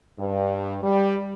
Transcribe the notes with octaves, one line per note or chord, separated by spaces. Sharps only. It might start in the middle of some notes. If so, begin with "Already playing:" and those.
G2
G3